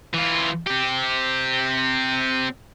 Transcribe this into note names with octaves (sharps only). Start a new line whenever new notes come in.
E3 F4
C4 G4